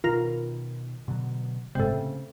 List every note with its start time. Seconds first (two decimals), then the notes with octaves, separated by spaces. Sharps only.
0.04 B2 D#3 F4 A#4
1.08 B2 D3 F#3
1.75 G1 A2 C3 G#3
1.92 C#3